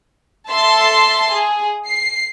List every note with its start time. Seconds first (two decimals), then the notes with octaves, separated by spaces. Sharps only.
0.52 A4 E5 A5 C6
1.34 G#4
1.88 C7